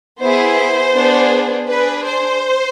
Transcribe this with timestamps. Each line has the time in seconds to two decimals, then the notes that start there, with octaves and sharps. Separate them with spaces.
0.21 B3 E4 G#4 C5
0.94 B3 D4 G#4
1.68 D4 G#4 B4
2.04 C5